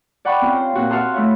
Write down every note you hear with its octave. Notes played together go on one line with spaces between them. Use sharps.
D5 F#5 G5 B5 C#6
C4 C#4 F4
C5
A#2 C4 F#4
F#4 F5 F#5 A5 C6 D#6
A3 E4 C#5